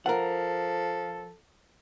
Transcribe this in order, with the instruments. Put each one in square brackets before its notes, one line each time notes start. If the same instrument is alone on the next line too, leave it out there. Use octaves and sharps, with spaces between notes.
[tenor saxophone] F3 [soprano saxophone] A4 [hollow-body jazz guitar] A#4 F#5